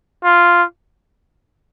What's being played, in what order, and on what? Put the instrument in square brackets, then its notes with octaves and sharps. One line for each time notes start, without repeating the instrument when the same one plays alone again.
[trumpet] F4